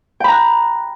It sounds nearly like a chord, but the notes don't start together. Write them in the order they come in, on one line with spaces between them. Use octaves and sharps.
G5 B5 A#5 F#6